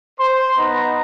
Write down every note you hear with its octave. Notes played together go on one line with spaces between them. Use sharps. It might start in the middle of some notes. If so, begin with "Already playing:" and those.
C5 C6
B3 D#4 B4 D#5 A#5